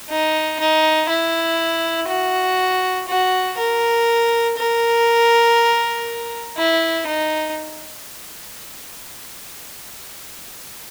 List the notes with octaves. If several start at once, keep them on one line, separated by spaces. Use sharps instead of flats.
D#4
D#4
E4
F#4
F#4
A#4
A#4
E4
D#4